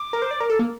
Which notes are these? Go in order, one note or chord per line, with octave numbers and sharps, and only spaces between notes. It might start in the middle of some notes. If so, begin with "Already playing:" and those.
Already playing: D6
A#4
C5
D5
A#4
A4
A#3